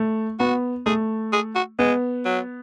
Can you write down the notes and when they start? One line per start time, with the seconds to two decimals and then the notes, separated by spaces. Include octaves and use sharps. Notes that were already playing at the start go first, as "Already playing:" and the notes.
Already playing: A3
0.39 B3 F#4
0.86 A3 G#4
1.33 G#4
1.55 F#4
1.79 G#3 B3
2.25 F#3